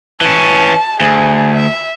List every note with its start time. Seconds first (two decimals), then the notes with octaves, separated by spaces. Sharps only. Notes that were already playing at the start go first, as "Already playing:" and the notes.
0.21 E3 C#4 A5
1.00 D2 G#4
1.55 E5